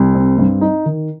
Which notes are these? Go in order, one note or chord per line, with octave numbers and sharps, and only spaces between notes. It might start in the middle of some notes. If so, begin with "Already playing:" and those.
Already playing: C2
C4
G2
D#4
D#3